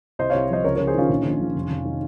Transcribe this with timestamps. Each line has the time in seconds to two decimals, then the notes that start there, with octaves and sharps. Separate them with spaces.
0.19 C2 C5 D#5
0.30 C2 C#5 F5
0.50 F3 C5 D#5
0.64 C#2 A#4 C#5
0.76 C#2 A#4 C#5
0.87 G#4 C5
0.94 D#3 C#4 F4
1.09 A#1
1.25 A#1
1.40 F3
1.55 F1
1.71 F1
1.85 D#3